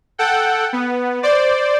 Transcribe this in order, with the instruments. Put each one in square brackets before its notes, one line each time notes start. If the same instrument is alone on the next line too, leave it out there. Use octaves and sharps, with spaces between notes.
[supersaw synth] A4 F#5 G5
B3
C5 D5